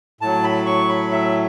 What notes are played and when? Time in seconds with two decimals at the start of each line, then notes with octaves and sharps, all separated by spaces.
0.21 A2 F#3 A5
0.44 B5
0.66 C#6
0.89 B5
1.12 E5